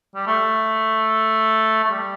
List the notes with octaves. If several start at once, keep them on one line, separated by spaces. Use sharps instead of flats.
G3
A3
A3
G3